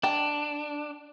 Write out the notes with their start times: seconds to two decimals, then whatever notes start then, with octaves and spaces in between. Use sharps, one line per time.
0.03 D4 G5 A#5